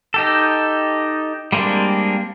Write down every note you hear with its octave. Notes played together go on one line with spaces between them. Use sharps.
D#4 G4 A4
G3 G#3 A#3 C4 D4